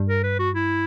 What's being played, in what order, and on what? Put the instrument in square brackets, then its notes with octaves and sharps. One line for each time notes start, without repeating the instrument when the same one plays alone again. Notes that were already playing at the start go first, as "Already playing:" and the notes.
Already playing: [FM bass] G2
[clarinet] A#4
B4
F#4
E4